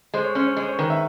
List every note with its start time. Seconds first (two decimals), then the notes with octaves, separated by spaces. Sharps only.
0.14 G#3 C5
0.24 C#5
0.35 C#4 C5
0.46 C#5
0.57 G#3
0.62 C5
0.68 C#5
0.79 D#3 B4
0.90 E5